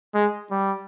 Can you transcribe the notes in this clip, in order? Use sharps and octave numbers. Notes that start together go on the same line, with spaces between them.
G#3
G3